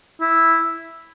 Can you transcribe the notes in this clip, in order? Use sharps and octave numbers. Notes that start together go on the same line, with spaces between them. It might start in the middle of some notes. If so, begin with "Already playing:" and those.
E4